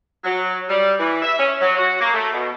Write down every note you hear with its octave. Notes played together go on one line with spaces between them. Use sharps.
F#3
G3
E3
E5
C#4
F#3
F#4
A#3
A3
B2